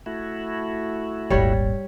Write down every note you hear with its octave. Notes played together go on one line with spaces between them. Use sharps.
A3 E4 F#4
D#1 G#1 G3 C#5